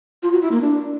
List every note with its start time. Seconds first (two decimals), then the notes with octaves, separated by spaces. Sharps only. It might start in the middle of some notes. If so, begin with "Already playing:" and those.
0.23 F4
0.32 F#4
0.42 E4
0.52 A#3
0.61 D4